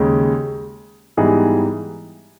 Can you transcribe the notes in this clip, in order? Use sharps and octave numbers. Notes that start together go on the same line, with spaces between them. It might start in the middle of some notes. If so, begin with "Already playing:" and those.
Already playing: D#2 C#3 G#3
G#2 E3 G3 B3 D#4 G#4